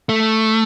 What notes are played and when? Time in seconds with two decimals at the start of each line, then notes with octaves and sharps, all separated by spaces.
0.09 A3